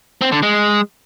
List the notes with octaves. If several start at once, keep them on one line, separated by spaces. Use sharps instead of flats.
C4
D3
G#3